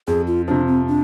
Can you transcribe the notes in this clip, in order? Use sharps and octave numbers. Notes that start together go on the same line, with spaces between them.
F2 G#4
F4
C3 F3 D4
C4
D4